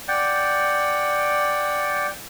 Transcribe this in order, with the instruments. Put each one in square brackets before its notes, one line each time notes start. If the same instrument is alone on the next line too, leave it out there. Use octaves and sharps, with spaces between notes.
[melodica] D5 F#5 G5